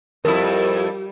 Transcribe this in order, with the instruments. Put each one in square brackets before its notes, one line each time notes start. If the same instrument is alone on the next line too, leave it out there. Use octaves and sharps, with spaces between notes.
[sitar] F2 E4 [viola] G3 G4 [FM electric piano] A#4